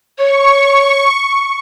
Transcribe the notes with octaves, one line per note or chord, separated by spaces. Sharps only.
C#5 C#6